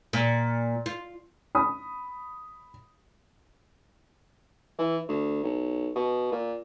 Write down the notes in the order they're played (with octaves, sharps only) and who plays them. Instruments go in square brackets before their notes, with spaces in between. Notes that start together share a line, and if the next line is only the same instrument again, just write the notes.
[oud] A#2
F4
[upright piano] B5 D#6
[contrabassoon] E3
D2
B1
B2
A#2